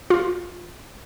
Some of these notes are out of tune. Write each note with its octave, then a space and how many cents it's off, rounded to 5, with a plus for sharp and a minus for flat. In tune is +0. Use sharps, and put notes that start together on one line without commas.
F4 +15